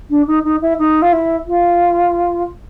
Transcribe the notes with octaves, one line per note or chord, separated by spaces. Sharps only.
D4
D#4
D#4
E4
D#4
F4
E4
F4